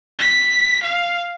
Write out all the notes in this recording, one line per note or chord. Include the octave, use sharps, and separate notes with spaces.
B6
F5